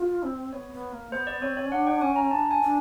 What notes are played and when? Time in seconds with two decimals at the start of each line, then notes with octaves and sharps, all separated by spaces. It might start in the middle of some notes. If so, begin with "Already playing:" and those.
Already playing: F4
0.23 C4
0.52 B3 C#5
0.72 B3
0.92 A#3
1.12 B3 C5
1.27 D5
1.42 C4 C#5
1.57 C#5
1.67 C#4
1.72 D4 F#5
1.87 G5
2.01 C#4 G#5
2.16 A#5
2.31 D4 A5
2.51 G#5
2.61 D4